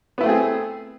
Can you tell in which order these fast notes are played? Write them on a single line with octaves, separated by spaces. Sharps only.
B3 E4 A3 C4 G#4